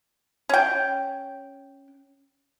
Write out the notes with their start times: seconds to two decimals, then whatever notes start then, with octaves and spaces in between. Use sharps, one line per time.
0.49 C#4 G5